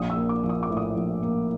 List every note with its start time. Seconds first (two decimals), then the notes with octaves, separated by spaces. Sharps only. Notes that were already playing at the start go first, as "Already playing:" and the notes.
Already playing: A#1 D#6
0.10 E6
0.17 A#3
0.29 D6
0.43 F3
0.49 D#6
0.63 D6
0.69 A2
0.77 D#6
0.96 A#1
1.23 A#3